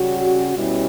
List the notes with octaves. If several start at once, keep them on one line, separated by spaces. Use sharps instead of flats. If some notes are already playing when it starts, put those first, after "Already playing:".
Already playing: C#3 G3 C#4 F#4
B2 G3 C#4 E4